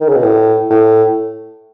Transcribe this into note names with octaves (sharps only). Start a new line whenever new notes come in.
D#3
C#3
B2
A2
A2